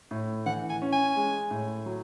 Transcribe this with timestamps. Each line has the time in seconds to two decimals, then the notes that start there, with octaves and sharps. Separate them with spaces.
0.11 A2
0.46 E3 F#5
0.70 G#5
0.82 C#4
0.93 G#5
1.16 G#3
1.51 A2
1.86 F#3